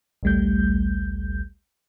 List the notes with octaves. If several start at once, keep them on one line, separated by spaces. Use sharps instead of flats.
A1 D2 G3 A3 G6